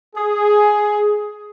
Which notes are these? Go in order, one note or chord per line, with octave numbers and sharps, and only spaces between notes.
G#4